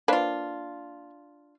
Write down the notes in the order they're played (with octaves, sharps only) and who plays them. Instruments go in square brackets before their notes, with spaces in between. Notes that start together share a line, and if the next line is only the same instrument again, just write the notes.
[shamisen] A#3 B4 C5 [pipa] D4 F4